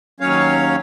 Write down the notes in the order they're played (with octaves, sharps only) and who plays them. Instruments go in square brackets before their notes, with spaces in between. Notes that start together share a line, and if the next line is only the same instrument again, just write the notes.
[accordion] D#2 F#3 C#4 C#5 F5